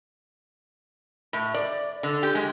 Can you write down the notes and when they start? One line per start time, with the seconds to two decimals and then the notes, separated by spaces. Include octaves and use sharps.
1.33 A2
1.54 D5
2.03 D3
2.23 G4
2.35 G#3